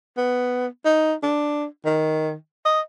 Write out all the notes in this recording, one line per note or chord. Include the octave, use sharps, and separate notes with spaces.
B3
D#4
D4
D#3
D#5